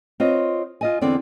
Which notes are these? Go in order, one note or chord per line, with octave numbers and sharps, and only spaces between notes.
C4 F4 B4 C#5 D#5
F4 D#5 G#5
E2 D3 B3 C4 D5